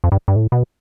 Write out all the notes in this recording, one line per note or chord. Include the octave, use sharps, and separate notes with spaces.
F2
G2
G2
A2
B2